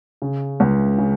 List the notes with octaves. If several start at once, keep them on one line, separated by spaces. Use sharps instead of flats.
C#3
C#2
C#3